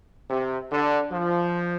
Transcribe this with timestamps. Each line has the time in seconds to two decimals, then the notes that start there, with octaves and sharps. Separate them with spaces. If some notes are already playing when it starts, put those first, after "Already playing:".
0.29 C3
0.71 D3
1.12 F3